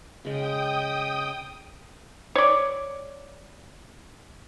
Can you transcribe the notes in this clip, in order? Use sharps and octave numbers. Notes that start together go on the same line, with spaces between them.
C#3 G#3 G5 D#6
C#5 D5